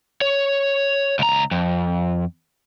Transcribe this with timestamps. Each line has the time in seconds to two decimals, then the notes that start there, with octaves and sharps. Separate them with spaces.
0.21 C#5
1.19 C#2 A#5
1.51 F2